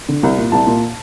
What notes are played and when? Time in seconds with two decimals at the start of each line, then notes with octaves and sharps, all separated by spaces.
0.09 D3
0.23 C2
0.37 A#2
0.52 C2 A5
0.67 A#2